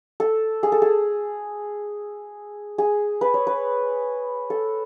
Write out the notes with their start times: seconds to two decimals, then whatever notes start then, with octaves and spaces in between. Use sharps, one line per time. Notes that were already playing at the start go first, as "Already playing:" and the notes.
0.20 A4
0.63 G#4
0.72 A4
0.82 G#4
2.78 G#4
3.21 B4
3.34 C#5
3.47 B4
4.50 A4